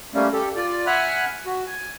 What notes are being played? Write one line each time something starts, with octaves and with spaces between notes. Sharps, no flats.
G3 A3 A#3 C#4
G4 A4
F4 D5
E5 F#5 G#5 B5 F6 F#6
F#4
G#5